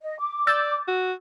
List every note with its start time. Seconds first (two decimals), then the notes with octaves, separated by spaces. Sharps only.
0.01 D#5
0.19 D6
0.47 D5 E6 G6 A6
0.88 F#4